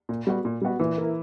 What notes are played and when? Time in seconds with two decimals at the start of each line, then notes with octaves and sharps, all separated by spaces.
0.09 A#2
0.27 G3 B3 F#4
0.45 A#2
0.62 G3 B3 F#4
0.80 A#2 E3
0.97 A#3 E4 A#4